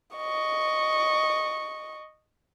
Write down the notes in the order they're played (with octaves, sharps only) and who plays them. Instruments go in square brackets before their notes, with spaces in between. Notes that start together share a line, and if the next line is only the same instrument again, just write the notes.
[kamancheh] D#5 C#6